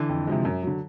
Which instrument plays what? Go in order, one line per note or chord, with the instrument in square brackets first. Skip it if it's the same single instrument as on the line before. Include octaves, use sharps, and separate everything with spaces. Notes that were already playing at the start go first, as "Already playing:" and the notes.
Already playing: [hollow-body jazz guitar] D3 E3
[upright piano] F2
C3 F3 G#3
F#2
D3 F#3